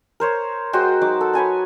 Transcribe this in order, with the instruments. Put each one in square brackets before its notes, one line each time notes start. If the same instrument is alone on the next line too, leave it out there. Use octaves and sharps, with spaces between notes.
[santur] A#4 C5 C#5
G#3 F#4 C5 G5
F#3 D#4 D6
A4
B4 C#5 G#5 A5